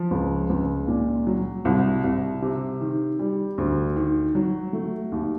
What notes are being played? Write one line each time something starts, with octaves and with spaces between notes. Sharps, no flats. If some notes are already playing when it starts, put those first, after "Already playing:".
Already playing: F3
C#2
C#2
A#2
F#3
C2
C2
C3
D#3
G3
D2
D#3
F#3
A3
D#2